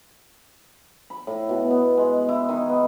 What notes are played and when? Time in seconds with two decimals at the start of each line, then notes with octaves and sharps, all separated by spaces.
1.10 B5
1.27 A2
1.49 B2
1.71 B3
1.97 G#3
2.29 E4
2.49 D#3
2.69 B3